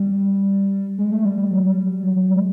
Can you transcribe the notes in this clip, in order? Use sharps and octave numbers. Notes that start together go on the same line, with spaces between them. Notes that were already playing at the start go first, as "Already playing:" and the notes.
Already playing: G3
G#3
A3
G3
G3
F#3
G3
G3
F#3
F#3
G3
G#3